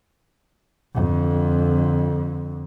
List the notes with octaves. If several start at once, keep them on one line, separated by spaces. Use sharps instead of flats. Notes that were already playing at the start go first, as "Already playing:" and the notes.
F2 D3